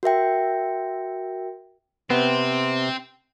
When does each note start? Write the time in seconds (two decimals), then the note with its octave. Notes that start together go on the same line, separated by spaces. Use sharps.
0.03 F#4 A#4 E5 G5
2.10 C3 B3 C4